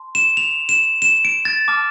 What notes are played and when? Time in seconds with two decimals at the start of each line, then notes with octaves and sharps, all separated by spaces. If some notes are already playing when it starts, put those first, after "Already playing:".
Already playing: A5 C6
0.15 E7
0.37 F7
0.69 E7
1.02 E7
1.25 D7
1.45 A6
1.68 A5 D6 F6